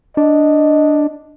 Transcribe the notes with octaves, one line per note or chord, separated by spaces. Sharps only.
D4 D#5